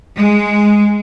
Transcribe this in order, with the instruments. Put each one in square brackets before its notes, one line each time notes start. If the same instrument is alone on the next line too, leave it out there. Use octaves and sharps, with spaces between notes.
[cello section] G#3